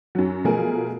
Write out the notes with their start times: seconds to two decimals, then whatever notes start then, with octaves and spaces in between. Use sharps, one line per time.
0.15 F#2 F#3
0.44 B2 F3 A3 F4 G#4 A#4